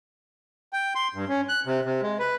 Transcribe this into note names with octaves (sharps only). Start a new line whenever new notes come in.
G5
C6
G2
C#4
F#6
C3
C3
G#3
B4